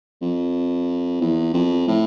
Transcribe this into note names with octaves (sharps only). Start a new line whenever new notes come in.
F2
E2
F2
A2